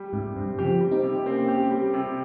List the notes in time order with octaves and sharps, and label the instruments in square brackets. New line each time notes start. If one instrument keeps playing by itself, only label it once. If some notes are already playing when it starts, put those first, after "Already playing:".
Already playing: [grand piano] G3
[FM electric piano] G#2 [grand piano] C3
[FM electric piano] G2 [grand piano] C4
[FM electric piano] C#3 F3 [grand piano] G4
[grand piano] G3
[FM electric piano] C4 D#4
[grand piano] C3
[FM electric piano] A#3 C#4 [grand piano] C4
[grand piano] G4
G3
C3